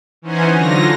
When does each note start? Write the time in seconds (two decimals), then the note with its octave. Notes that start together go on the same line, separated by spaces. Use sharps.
0.22 E3 C#4 D#4 C5 F#5 G#5
0.52 D3 F#3 F4 A#6